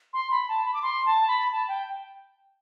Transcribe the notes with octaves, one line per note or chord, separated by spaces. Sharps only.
C6
B5
A5
B5
D6
C6
A5
B5
A5
G5